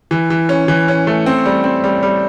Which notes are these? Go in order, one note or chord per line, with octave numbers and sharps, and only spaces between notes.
E3
E3
C#4
E3
C#4
A3
C4
G3
C4
G3
G3